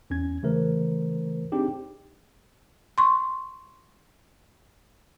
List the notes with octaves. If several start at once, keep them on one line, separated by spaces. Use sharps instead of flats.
E2 C#4 G#6
C#3 E3 A3 A#4 C5
C4 D4 D#4 G4 G#4
C6 C#6